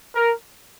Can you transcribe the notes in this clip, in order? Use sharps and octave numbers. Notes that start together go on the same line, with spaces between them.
A#4